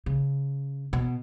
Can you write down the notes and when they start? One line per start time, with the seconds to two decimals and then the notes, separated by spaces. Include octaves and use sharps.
0.06 C#3
0.93 B2